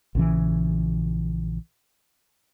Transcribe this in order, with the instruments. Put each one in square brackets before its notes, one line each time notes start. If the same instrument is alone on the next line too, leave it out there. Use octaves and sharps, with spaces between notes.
[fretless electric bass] A#1 C#3 E3